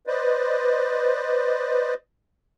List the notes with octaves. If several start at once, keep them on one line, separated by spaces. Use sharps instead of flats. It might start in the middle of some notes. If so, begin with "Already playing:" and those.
B4 C5 D5 D#5